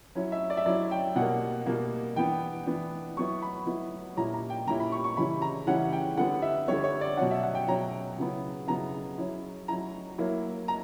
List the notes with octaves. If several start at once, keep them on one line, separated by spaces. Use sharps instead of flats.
F#3 C#4 E4
E5
D5
E5
F#3 C#4 E4 D5
G5
B2 G3 A#3 F#5
B2 G3 A#3
E3 B3 D4 G5
E3 B3 D4
F#3 B3 E4 C#6
B5
F#3 B3 E4
A#2 G3 C#4 E4 A#5
A#5
G5
A#2 G3 C#4 E4 A#5
B5
C#6
C#6
C#3 E3 G3 C#4 E4 B5
A#5
C#3 E3 G3 C#4 E4 F#5
G5
D3 G3 B3 F#5
E5
D3 G3 B3 C#5
C#5
D5
B2 F#3 C#4 F#5
E5
F#5
G5
B2 F#3 C#4 A#5
C#3 F#3 B3 E4
C#3 F#3 B3 E4 A#5
F#3 C#4 E4
F#3 C#4 E4 A#5
F#3 A#3 E4
A#5